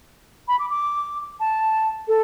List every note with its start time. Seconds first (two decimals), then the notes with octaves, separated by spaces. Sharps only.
0.48 B5
0.59 D6
0.70 D6
1.40 A5
2.07 A4